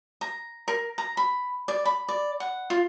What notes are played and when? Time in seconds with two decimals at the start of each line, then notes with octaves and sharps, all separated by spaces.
0.21 A#5
0.68 A#4
0.98 A#5
1.17 B5
1.68 D5
1.85 B5
2.09 D5
2.40 F#5
2.70 F4